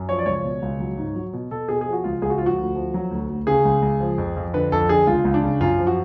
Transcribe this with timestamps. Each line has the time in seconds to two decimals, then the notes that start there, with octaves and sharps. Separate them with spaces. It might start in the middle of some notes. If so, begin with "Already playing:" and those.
Already playing: F#2
0.09 F3 C#5
0.18 D5
0.26 C#2 C#5
0.44 B2
0.62 C#2
0.80 F#3
0.97 G#2
1.15 F#3
1.33 B2
1.51 B2 A4
1.69 B2 G#4
1.81 G#4
1.86 F3
1.93 F#4
2.04 C#2 F4
2.22 C#2 G#4
2.30 F#4
2.38 F3 F4
2.46 F#4
2.58 D2
2.75 F3
2.94 F#3
3.11 D2
3.29 D2
3.47 C#3 G#4
3.65 C#2
3.82 C#2
4.00 F3
4.18 F2
4.36 F2
4.54 D3 B4
4.72 F2 A4
4.89 D3 G#4
5.07 C#2 F4
5.25 C#2
5.34 D4
5.43 C#3
5.61 F#2 F4
5.79 F3
5.87 F#4